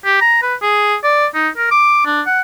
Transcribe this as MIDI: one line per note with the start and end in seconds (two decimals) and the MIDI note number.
0.05 0.19 67
0.21 0.40 82
0.43 0.55 71
0.62 0.96 68
1.04 1.27 74
1.35 1.49 63
1.58 1.69 70
1.71 2.05 86
2.06 2.22 62
2.27 2.41 78